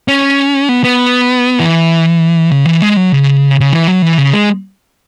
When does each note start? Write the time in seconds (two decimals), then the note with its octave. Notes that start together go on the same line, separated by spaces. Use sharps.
0.08 C#4
0.69 B3
0.84 B3
1.59 E3
2.51 C#3
2.65 E3
2.82 G#3
2.97 F#3
3.12 C#3
3.60 C#3
3.72 E3
3.88 F#3
4.02 E3
4.18 C#3
4.33 G#3